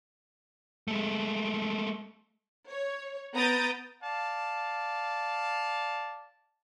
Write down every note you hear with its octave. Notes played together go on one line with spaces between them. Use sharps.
G#3 A3
C#5
B3 A#5 D#6 G6 A6 D7
D5 F5 A5